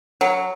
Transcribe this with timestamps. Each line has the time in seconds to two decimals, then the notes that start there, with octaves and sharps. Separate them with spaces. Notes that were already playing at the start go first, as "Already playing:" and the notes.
0.21 F#3